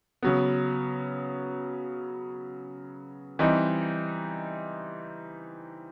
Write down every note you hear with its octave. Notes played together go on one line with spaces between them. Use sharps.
C#3 F#3 B3
E3 G3 C4 D#4